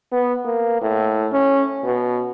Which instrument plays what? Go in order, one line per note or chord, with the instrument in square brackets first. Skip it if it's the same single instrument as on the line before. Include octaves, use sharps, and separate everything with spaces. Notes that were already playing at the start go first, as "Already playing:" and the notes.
[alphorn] B3
A#3
A2
C#4
B2